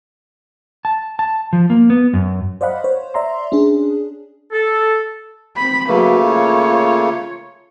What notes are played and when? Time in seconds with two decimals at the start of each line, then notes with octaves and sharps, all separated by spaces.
0.85 A5
1.19 A5
1.53 F3
1.70 A#3
1.90 B3
2.13 F#2
2.61 C5 D5 D#5 F5 F#5 B5
2.84 C5 C#5
3.14 D5 E5 A#5 C6
3.52 C#4 D4 G#4
4.52 A4
5.57 C4 B5
5.88 C#3 F#3 A3 A#3 B4
6.25 F4 C#5